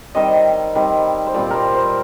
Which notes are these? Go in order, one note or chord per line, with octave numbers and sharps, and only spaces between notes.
D#3 G3 C4 D#5
D#3 G3 C4
C5
A#2 G3 C4 D5
A#4 C5
C5